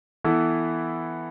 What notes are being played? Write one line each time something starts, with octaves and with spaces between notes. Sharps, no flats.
E3 B3 E4 A4